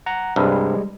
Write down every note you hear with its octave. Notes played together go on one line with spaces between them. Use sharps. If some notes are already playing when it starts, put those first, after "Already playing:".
F#5 A#5
C2 G2 G3 G#3